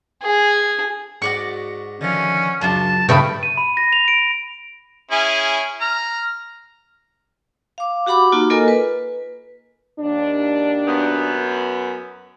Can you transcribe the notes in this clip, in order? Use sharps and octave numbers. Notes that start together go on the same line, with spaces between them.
G#4
G#2 F#4 D5 C#6
D3 D#3 F3 C#4
C#2 F#2 D4 F4 A#4 A5
G2 C#3 A3 B4 G5 B5
D#7
B5
A#6
F7
D7
C#4 E4 G#4
A#5 F6
F5 D6
F#4 G4 F#5 B5 D6
A#3 D#4 F4 F#4
A#3 F4 A4 A#4 D#5 G#5
B4
D#2 D4
F#2 B3